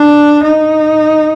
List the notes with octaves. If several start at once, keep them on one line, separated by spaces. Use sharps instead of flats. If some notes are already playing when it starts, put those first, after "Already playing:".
Already playing: D4
D#4